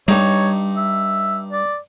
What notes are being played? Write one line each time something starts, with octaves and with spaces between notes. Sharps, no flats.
G2 G3 D#4 C#5
E5
D5